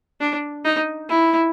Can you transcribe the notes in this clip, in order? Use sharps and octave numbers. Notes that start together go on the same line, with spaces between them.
D4
D#4
E4